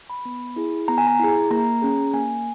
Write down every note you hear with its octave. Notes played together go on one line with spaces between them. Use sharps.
B5
B3
E4 G#4
B3 A#5
G#5
A#5
E4 G#4
A#3 A#5
C#4 G#4
A#3 G#5